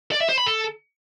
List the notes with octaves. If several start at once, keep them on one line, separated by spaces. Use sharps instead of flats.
D5
E5
C5
B5
A4